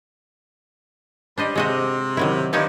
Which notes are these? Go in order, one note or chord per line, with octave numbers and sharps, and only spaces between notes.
G3 D4 C5 D#5
C3 G#3 F#4 D#5
D#3 F#3 E4
G2 F3 D#4 C#5 A5